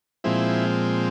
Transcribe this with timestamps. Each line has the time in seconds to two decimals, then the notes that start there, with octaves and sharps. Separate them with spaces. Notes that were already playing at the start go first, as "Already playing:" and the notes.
0.24 A#2 F3 G#3 C4 E4